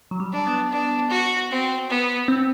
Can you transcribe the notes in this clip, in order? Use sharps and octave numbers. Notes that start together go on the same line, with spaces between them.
F#3
G3
D4
B3
D4
F#4
C4
B3
C4